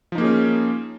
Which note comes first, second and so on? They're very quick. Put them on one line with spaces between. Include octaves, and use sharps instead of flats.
F3 D#4 A#3 G#4 C#4